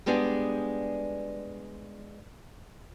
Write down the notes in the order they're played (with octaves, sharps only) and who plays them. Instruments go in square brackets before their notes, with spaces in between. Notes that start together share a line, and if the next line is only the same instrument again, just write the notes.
[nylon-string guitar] G3 G#3 B3 D4 G4 G#4